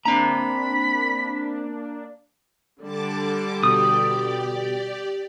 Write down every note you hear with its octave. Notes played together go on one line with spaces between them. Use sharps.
A#3 C4 D4 A#5 B5
D3 G3 A5 D6
B2 G4 D5 D#6